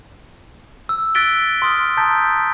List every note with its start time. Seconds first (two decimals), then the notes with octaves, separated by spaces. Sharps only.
0.89 E6
1.15 E6 F#6 A6 B6 D7 G7
1.62 C6 D#6 F6
1.97 A5 A#5 D#6 G6 A6 B6